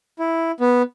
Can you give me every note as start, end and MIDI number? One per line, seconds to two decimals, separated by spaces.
0.19 0.51 64
0.60 0.82 59